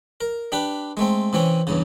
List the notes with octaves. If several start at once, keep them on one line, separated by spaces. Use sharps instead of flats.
A#4
D4 G4 B4
G#3 A3 C4
C3 E3 C4 C#4
E2 G2 C#3